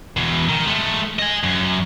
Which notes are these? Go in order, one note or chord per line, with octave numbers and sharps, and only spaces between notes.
E2 B2
D#3
G#3 A3
D#5 G#5
F#2